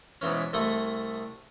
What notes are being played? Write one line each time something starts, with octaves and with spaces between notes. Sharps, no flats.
G#2 B2 E3 C#4
C2 A3 A4 D#5 B5